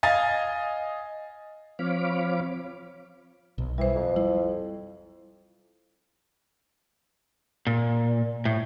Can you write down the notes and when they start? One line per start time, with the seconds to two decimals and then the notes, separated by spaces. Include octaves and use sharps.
0.03 D#5 F5 G#5 A6
1.79 F3 C4 C#5 F5 B5 D6
3.58 B1
3.78 E3 G3 C5
3.95 F2
4.16 G3 E4
7.67 A#2
8.45 A2